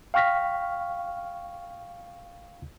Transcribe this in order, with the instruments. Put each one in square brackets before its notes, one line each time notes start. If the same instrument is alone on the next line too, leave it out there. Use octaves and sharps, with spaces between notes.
[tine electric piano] F5 G5 C#6 F6 A#6 B6